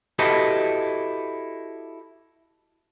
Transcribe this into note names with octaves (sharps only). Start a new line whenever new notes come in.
E4 F#4 G4 A4 B4 D#5